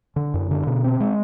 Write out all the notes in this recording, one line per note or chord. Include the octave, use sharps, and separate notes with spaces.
D3
F#2
D3
B2
C4
G#3